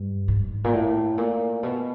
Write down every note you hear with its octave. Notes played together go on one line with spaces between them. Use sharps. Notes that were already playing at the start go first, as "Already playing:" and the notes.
Already playing: G2
G#2
A#2
A2
A#2
B2